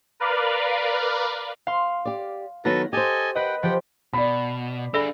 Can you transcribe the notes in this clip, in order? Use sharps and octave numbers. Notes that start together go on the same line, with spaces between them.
A#4 B4 D5 F5
F5 C6
G4 D5
D#3 F#3 B3 F#4 A4 B4 A#6
G4 A4 C5 D#5 G#5
B4 D#5 F#5 G5
F3 G4 F#5 G5
B2 D5 B5
D4 G#4 A4 D5 B5